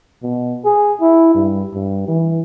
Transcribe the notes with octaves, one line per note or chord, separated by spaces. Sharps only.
B2
G#4
E4
G2
G2
E3